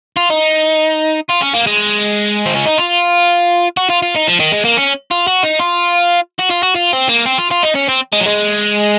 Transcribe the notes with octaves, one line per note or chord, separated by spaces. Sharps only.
F4
D#4
F4
C#4
A#3
G#3
C4
C#4
D#4
F4
F#4
F4
F4
D#4
F3
D#3
G#3
A#3
C#4
F4
F#4
D#4
F4
F#4
F4
F#4
F4
C4
A#3
C4
F4
F4
D#4
C#4
C4
G#3
F#3
G#3